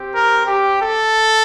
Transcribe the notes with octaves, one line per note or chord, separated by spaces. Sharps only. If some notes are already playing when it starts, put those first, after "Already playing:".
Already playing: C4 G4
A#4
G4
A4